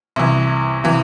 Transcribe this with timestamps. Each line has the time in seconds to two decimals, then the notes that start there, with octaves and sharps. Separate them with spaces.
0.16 C2 C3 E3
0.84 C3 E3